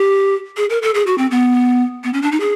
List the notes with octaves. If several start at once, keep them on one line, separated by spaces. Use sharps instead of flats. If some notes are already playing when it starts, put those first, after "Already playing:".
Already playing: G4
G#4
A#4
A4
G#4
F#4
C4
B3
B3
C#4
D4
D#4
G#4